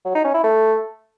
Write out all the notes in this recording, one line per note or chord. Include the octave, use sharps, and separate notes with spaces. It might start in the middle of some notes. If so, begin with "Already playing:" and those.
F#3
D#4
C#4
E4
A3